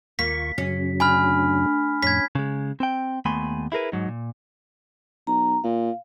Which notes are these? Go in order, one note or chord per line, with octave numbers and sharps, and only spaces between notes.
D#2 A#3 F4 C#6 B6
F#2 C#3 F#3 C#4
D2 G#5 B5 F6
F2 A2 C#4 G#6 B6
C#3 G#3
C4 G5
D#2 A3 B3 G#5 B5 C6
E4 G#4 A#4 B4
G#2 F#3 D#4
A#2
B1 A#5
A#2 F5